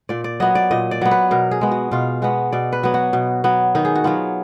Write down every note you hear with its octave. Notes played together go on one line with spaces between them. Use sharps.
A#2 D5
D5
F#3 B3 D#5
D5
A#2 D#5
D5
F#3 B3
B4
B2 A#4
G#4
G#3 B3
F#4
B2 F4
G#3 B3 F#4
B2 D5
B4
F#3 B3
F#4
B2
F#3 B3
D#3 D#4
G#4
F#4
F#3 B3 F4